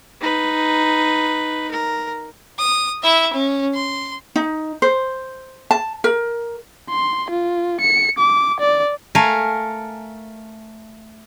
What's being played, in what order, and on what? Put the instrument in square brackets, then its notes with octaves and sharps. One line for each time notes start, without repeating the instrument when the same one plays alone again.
[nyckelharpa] D#4 B4
A#4
[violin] D#6
E4 E5
C#4
C6
[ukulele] D#4
C5
A5
A#4
[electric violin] C6
F4
C#7
D6
D5
[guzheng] A3 A#4 F5 G#5